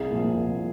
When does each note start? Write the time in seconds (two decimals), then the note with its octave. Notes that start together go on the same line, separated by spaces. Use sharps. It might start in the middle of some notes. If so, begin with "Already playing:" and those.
Already playing: C2 G#4
0.11 A#2 F3
0.35 C2